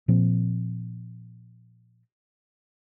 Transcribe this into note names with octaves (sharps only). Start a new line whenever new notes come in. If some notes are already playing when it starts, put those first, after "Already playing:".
A#2 F3 C4